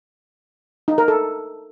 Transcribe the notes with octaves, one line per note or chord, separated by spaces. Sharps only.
D#4
A#4
A4